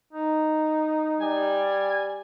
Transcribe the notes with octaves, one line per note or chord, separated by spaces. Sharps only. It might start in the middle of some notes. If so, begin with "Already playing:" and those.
D#4
G3 G#5